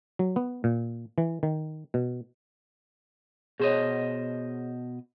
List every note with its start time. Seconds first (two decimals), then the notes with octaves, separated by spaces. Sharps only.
0.19 F#3
0.36 B3
0.64 A#2
1.18 E3
1.43 D#3
1.94 B2
3.60 B2 G#4 C5 C#5 D#5